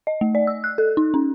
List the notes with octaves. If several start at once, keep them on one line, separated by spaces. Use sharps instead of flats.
D#5
A3
D5
E6
F#6
A4
D#4
C#4